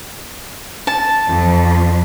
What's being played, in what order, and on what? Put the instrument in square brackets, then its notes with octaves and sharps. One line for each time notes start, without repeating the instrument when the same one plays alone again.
[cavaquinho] A5
[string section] F2